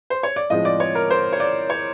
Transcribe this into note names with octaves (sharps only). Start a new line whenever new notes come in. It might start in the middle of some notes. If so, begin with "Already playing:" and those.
C5
C#5
D5
A2 F3 G#3 C4 D#5
D5
C#5
A#4
C5
C#5
D5
C#5